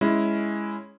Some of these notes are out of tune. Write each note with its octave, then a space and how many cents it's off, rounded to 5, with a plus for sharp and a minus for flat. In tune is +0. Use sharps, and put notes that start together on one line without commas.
G#3 +0 C#4 +0 E4 +0